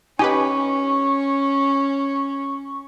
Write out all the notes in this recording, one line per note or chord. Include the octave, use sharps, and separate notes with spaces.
C#4 D#4 G4 B4 G#5 C#6